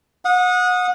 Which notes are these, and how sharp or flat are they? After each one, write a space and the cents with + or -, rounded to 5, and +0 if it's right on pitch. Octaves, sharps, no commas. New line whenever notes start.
F#5 -30 D#6 +0